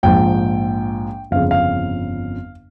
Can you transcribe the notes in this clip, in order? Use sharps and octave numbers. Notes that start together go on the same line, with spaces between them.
A#1 G#2 F3 G5
G1 F2 C#3 F5
F5